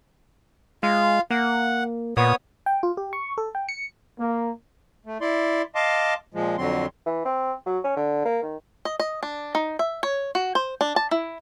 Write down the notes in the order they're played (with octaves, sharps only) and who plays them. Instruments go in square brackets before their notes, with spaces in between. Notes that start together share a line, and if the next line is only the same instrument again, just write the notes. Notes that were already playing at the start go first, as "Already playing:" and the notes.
[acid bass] G#3 [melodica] F4 F5
[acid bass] A#3 [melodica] F#5
[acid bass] A#2 [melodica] B3 C#5 D#6
[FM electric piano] G5
F4
G4
C#6
A4
G5
C#7
[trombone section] A#3
[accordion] A3
E4 D5 C6
D#5 F5 A5 C6 D6
A#2 F3 G#3
F2 D3 F#3 C4 C6
[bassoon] E3
C4
F#3
C#4
D3
A#3
D#3
[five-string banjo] D#5
D#5
D4
D#4
E5
C#5
F#4
C5
D4
A5
E4